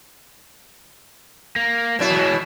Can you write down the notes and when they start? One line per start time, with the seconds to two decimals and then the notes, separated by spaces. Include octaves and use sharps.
1.56 A#3
1.99 B2 F#3 E4
2.11 E3 G#3